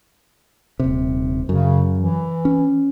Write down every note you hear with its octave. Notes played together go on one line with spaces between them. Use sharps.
D#1 C3
F#2 C#3
E3
C#4